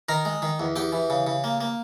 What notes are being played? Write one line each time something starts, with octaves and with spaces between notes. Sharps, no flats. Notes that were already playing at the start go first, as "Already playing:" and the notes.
D#3 A#4 A#5
G#3
D#3
E2
E2 G4 G5
E3
C#3
C#3
A#3
A#3